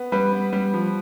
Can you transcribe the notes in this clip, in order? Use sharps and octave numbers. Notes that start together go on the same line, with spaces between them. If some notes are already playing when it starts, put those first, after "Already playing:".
Already playing: B3
G3 B4
B3
G3
F3